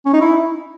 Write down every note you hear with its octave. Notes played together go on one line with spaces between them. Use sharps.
C#4
D#4
E4